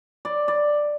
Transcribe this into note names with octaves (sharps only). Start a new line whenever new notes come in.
D5
D5